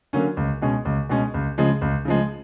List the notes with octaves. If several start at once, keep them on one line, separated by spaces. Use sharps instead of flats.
D3 F#3 A#3 C#4
C#2
B2 G#3 C#4
C#2
B2 G#3 C#4
C#2
C#3 F3 G#3
C#2
C#3 F3 G#3